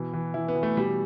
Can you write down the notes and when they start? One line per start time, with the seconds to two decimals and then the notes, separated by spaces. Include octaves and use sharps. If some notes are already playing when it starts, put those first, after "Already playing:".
Already playing: B2 E3
0.13 E3
0.34 E3 E4
0.48 B3
0.56 E3
0.63 A3
0.77 B2 G3